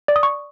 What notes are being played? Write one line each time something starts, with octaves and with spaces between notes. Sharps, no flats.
D5
D#6
C#6